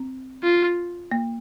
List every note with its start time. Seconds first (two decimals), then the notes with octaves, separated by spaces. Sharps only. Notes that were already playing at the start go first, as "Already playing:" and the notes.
Already playing: C4
0.43 F4
1.12 A#3